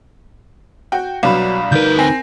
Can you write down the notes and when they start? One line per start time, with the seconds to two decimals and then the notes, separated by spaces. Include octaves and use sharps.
0.92 F#4 G5
1.23 C2 B2 F#3 D4 F5 B5
1.72 D2 D#4 A#4 B4 G6
1.99 C4 G#5 A#6